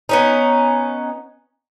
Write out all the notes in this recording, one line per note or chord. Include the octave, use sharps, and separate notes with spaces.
B3 C#4 D#4